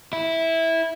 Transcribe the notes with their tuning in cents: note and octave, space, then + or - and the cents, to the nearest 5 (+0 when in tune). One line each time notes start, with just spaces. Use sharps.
E4 -10